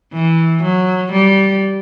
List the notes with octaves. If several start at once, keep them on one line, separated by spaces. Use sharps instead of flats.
E3
F#3
G3